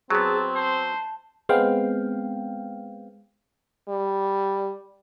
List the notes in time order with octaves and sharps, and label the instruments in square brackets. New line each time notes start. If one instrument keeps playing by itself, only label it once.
[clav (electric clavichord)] F#3 B3 [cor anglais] C4 [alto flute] G#4 [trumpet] A5
[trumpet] C5 [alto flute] A5
[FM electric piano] G#3 B3 C4 F5 G5
[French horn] G3